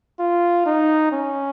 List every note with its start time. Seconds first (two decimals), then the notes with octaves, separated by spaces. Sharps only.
0.19 F4
0.66 D#4
1.12 C#4